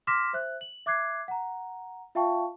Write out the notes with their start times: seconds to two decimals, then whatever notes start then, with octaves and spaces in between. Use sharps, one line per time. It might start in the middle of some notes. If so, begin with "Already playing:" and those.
0.07 C6 D6 F6 A#6 B6 E7
0.33 C5 E5 F#6
0.61 F#7
0.86 E5 D6 F#6 G#6 C7
1.28 F#5 A#5
2.15 F4 E5 F5 G5 A5 C#6